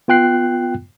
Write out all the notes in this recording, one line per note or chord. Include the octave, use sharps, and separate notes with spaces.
B3 F4 G5 F#6 C7